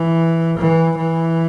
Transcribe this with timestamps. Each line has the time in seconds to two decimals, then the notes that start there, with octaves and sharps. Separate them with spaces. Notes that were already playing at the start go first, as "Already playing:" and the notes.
Already playing: E3
0.58 E3
0.97 E3